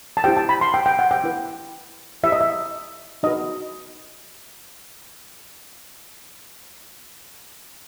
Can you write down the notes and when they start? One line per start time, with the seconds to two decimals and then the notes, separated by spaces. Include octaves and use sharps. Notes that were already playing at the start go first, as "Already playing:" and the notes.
0.17 A5
0.24 E4 G4 C5 G5
0.37 A5
0.49 B5
0.61 C6
0.74 G5
0.86 G5
0.99 F#5
1.11 G5
1.24 E4 B4
2.23 E4 G4 C5 E5
2.32 D#5
2.41 E5
3.23 D#4 F#4 B4 D#5